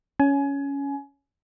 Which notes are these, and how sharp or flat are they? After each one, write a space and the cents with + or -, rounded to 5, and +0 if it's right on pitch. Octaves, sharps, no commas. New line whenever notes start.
C#4 +10 G#5 +25